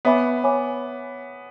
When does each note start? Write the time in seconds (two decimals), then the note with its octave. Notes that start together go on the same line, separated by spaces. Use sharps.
0.05 B3 C#5 E5 G#5 B5 D6
0.44 C#5 E5 G#5 B5 D6